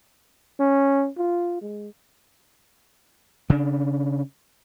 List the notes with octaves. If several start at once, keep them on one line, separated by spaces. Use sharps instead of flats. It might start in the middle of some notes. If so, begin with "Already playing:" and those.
C#4
F4
G#3
C#3 D4